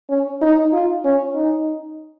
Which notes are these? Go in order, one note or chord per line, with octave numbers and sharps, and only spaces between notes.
C#4
D#4
F4
C#4
D#4